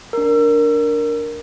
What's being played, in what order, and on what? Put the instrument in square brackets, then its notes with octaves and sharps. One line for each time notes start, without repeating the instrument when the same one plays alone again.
[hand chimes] D4 A#4